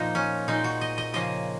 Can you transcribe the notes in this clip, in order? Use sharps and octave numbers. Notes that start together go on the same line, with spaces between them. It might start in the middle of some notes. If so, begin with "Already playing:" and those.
Already playing: A#2 F3 A#3 D#4
C#4
A#2 G#3 C4 D#4
F#4
D#5
D#5
C#3 F3 A#3 D#5